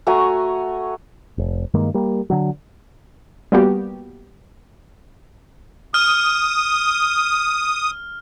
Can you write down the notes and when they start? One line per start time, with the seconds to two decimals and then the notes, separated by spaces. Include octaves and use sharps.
0.07 A3 F#4 G#5 A#5
1.38 F1
1.74 G2 D#3 G#3 A#3
1.94 G3 A#3
2.30 D3 F#3
3.52 G3 A#3 B3 F#4 G4
5.94 D#6 F6